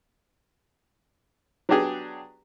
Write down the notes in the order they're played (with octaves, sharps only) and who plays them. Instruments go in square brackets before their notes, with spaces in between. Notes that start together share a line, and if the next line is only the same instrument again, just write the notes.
[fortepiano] F#3 B3 D4 G4 G#4